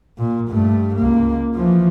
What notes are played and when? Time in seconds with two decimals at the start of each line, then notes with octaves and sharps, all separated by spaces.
0.18 A#2
0.48 G2 A3
0.95 C#2 A#3
1.54 E3 F3